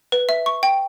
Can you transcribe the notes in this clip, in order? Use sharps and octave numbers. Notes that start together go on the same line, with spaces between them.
B4
E5
C#6
G5